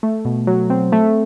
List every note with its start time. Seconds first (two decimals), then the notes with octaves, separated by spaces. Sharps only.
0.03 A3
0.25 B2
0.47 F#3
0.70 C4
0.92 A3